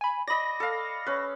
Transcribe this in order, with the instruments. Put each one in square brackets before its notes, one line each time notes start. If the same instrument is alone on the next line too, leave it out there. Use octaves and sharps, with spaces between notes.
[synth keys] G#5 B5
[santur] D5 D#5 [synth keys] B5 A#6
[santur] A4 F5
C#4 B4